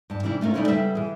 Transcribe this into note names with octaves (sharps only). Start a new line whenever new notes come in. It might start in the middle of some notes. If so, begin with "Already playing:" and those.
G2 A5
C3 E3 G3 D4 E4
A3 C#4 D4 F4 A#4
G3 C#4 D#4 E4 A4 C#5
C#3 G3 B3 A4 E5
E3 G#4